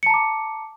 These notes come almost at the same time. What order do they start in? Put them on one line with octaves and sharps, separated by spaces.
C#7 A5 A#5 D6